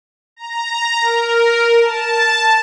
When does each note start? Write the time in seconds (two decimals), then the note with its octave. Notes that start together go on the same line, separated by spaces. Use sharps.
0.36 A#5
1.01 A#4
1.81 A5